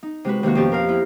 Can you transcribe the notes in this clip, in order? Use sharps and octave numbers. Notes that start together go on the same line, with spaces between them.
D#4
C3 G#3 F#4 B4
C3 D#3 A#3 F#4
F2 B2 C#4 G4 A5
A#4 C5 F5
E4 F4